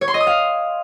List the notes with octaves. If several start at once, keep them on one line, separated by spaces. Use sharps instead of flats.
C#5
C6
D#5
D#6
F5